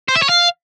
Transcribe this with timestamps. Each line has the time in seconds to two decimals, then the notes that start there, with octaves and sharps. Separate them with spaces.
0.09 C5
0.15 E5
0.22 C#5
0.29 F5